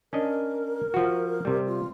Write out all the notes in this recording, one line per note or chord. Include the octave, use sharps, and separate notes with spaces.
C#4 D4 A#4 D#5
F3 F#4
C3 G3
F4